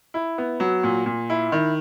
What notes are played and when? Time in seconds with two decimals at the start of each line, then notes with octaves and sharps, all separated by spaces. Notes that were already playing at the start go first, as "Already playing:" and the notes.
0.14 E4
0.38 B3
0.60 F#3
0.83 A#2
1.06 A#2
1.30 E4
1.52 D#3